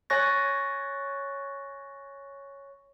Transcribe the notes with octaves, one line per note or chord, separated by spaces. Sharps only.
C#5 G#5 C#6 F#6 A6 A#6